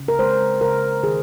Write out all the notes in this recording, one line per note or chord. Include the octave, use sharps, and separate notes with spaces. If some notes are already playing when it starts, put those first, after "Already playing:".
Already playing: C#3
A#4
G#3 C5
C#3 A#4
D#3 G#4